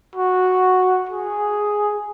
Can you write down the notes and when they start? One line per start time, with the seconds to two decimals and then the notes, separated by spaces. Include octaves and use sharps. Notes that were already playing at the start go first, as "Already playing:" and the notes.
0.16 F#4
1.09 G#4